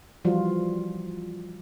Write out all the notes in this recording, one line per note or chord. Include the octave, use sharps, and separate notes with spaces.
E3 F3 G3 F4 F#4